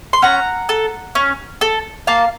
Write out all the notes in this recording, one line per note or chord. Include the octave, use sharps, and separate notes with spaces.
C6
C#4 F#5 A#5
A4
C#4
A4
A#3 F5 A5